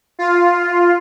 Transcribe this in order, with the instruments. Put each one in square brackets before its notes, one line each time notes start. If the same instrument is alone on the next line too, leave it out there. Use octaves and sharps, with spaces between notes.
[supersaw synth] F4